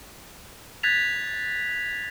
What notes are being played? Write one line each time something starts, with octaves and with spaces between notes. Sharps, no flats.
F#6 G#6 A6 B6 F7